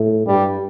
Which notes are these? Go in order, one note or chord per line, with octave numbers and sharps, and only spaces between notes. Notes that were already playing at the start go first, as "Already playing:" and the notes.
Already playing: A2
G2 G3